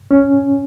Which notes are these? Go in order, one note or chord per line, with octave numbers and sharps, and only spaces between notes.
C#4